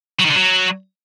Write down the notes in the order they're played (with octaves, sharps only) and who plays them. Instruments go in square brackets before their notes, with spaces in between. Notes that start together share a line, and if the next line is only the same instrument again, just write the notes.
[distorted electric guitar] F#3
D#3
D3
F#3